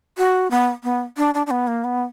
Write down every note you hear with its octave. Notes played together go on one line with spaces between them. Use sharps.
F#4
B3
B3
D4
D4
D4
B3
A#3
B3